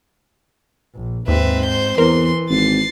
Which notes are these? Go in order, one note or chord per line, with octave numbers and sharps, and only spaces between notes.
A#1
D#2 G#2 C4 B4 E5
C5 G6
E2 E3 A#4 C6
G#1 A6 C7